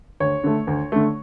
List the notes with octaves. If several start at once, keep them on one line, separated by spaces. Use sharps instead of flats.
D2 C#5
D3 A3
D2
D3 A3